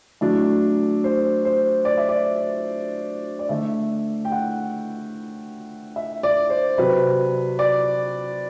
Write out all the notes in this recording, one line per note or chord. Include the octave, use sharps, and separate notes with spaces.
A2 F#3 A3 D4
C5
C5
D5
E5
D5
D5
D3 A3 D4 E5
G5
F#5
E5
D5
C5
C3 F#3 C4 B4
D5